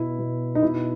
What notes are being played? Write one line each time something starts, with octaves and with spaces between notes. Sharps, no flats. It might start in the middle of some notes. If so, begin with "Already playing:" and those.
Already playing: B2 E4
B2
D#4
B2 E4